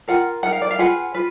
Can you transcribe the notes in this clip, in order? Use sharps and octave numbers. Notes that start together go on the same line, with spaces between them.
F4 A#4 F#5
D#4 A#4 F#5
F5
D5
F5
F4 G#4 B4 F#5
F4 B4